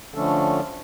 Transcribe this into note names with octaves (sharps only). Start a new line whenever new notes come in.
D3 F3 A3 C#4 D4 A4